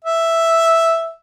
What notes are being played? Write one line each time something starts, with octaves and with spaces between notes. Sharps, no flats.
E5